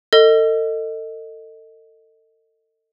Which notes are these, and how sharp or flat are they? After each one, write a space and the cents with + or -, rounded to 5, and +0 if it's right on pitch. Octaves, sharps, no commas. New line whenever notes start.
A4 +35 D#5 +0